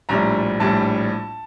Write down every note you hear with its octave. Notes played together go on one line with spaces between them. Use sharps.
A#1 A2 G3 D4 A#5
A#1 A2 G3 D4 A5